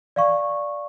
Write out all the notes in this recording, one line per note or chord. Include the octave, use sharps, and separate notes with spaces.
D5 F5 C#6